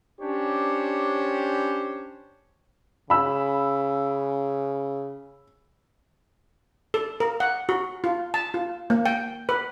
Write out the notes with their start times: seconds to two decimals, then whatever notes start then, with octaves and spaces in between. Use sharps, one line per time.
0.21 C#4 D4 G4 C5 C#5
3.10 C#3 B5 E6
6.94 A4
7.20 A#4
7.40 F#5
7.69 F#4
8.04 F4
8.34 A5
8.54 F4
8.90 A#3
9.06 G5
9.49 B4